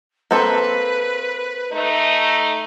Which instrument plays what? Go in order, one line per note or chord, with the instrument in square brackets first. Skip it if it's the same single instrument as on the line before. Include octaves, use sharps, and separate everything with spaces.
[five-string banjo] A#3 C4 A4 [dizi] B4
[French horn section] A3 D#4